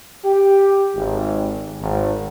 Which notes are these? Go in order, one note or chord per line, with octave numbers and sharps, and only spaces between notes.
G4
G#1
G#1